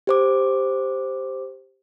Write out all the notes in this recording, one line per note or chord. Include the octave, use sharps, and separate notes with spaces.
G4 C5 D6